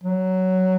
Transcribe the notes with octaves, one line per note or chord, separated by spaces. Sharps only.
F#3